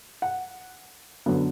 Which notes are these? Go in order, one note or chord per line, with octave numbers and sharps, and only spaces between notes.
F#5
F#2 D3 F#3 B3